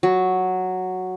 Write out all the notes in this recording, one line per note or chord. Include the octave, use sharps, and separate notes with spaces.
F#3